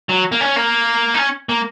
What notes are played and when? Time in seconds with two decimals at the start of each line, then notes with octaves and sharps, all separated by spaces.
0.09 F#3
0.32 A#3
0.41 C#4
0.56 A#3
1.14 D#4
1.18 C#4
1.49 A#3